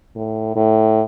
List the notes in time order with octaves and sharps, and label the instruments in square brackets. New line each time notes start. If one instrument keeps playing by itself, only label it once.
[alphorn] A2
A2